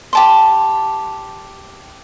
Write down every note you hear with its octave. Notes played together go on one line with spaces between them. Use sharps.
G4 A5 C6